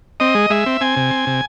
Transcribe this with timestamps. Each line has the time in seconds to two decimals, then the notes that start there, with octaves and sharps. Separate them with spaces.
0.20 C4 D#5
0.35 G#3
0.50 G#3 E5
0.66 C4
0.81 C4 G#5
0.97 C3
1.11 C4
1.27 C3